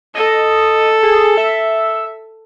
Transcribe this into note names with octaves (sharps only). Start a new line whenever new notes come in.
A4 D#5
G#4
E5